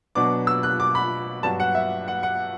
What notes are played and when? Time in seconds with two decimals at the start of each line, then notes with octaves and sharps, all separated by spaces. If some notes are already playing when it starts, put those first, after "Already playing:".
0.15 B2 F#3 B3 D4 D6
0.47 E6
0.63 F#6
0.80 D6
0.95 B5
1.43 G2 F#3 B3 A5
1.60 F#5
1.75 E5
2.08 F#5
2.23 F#5